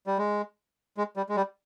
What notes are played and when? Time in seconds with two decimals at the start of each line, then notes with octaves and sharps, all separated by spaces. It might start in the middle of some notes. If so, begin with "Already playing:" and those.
0.07 G3
0.18 G#3
0.97 G#3
1.16 G3
1.29 G#3
1.36 G3